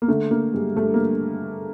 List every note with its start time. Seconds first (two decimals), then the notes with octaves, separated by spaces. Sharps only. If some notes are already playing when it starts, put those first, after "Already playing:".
0.02 A#3
0.08 D3 A3
0.31 D3 A#3
0.54 G2 G#3
0.76 G2 A3
0.94 A#3